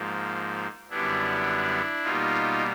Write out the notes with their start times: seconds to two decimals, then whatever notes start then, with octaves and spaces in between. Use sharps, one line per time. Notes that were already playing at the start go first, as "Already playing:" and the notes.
Already playing: G#2 F3 A#3
0.90 F#2 D3 G3 B3 D4 E4
2.04 B2 G3 A#3 D#4 F4